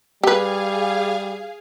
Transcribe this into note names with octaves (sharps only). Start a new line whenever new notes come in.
G3 G4 G#4 B4 F5